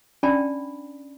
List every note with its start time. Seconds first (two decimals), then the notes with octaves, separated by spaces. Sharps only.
0.23 C#4 D4 D5 G5 A5 B5